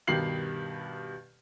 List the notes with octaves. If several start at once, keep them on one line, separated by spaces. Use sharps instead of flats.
G2 B2 D#3 G4 C7 F#7